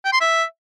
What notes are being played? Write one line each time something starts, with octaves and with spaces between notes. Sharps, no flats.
G5
C6
E5